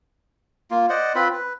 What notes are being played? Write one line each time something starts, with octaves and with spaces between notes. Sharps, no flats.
A#3 F4
C5 D5 D#5 F#5
C4 F4 B4 B5
B4